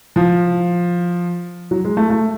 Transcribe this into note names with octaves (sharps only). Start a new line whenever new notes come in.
F3
F#3
G#3
A3
A3